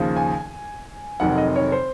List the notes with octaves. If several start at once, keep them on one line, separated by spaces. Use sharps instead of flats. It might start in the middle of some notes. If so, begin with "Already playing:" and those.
Already playing: D#2 C#3 F3
G#5
F1 F2 D#3 F#3 F#5
D#5
C#5
C5